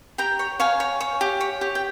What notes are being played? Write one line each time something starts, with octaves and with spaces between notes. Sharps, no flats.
G4 G5 A#5
C#5
C#5 F5 G#5
C#5
C#5
G4
C#5
G4
G5